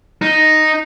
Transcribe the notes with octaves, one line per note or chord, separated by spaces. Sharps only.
D#4